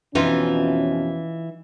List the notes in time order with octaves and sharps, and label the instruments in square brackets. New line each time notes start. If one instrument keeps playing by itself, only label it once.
[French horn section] F2 B2 C#4 [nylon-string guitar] E3 D#4 F4